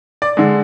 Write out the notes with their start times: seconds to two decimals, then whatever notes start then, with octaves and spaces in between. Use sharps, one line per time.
0.22 D5
0.37 D3 G#3